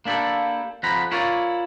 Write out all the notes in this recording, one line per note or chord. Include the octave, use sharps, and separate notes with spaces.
A#3 D4 E4 G4 A4
F2 F3 F#5 A#5 B5
E4 F4 A#4 C#5 D5